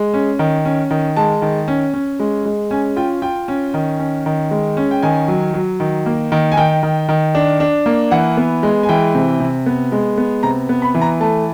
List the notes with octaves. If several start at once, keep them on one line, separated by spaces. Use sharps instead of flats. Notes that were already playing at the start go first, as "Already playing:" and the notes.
Already playing: G#3
C#4
D#3
C#4
D#3
G#3 A5
D#3
C#4
C#4
G#3
G#3
C#4 G#5
F4 G5
F4 G5
C#4
D#3
C#4
D#3
G#3
C#4
G5
D#3 G#5
F#3
F#3
D#3
A#3
D#3
G#5
D#3 G5
D#3
D#3
D4
D4
A#3
E3 F#5
B3
G#3
G#5
E3 G5
C3
C3
B3
G#3
B3
C3 A#5
B3
B5
E3
A#5
A3 A5